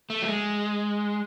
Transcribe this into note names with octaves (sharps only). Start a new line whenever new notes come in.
A3
F#3
G#3